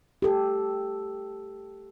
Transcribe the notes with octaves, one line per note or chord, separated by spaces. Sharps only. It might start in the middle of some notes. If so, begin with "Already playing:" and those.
G4 A4